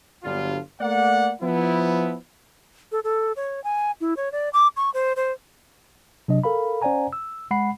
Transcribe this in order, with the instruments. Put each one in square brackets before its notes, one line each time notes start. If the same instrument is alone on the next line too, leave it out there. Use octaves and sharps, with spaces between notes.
[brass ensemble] G1 D3 F#3 G3 F4
A3 A#3 D5 F#5
F3 B3 E4
[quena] A4
A4
C#5
G#5
E4
C#5
D5
D6
C#6
C5
C5
[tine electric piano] C3 F#3 D4 D#5
A4 A#4 F5 B5
C#4 C5 D5 F#5 G#5 A#5
E6
G#3 F#5 B5 C7